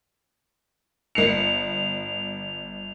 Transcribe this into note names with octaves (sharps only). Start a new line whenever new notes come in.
G1 C7 C#7 F7